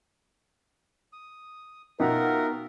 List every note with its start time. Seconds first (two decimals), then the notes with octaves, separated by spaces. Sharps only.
1.13 D#6
2.00 B2 D#4 F4 A#4 E5 F#5 G5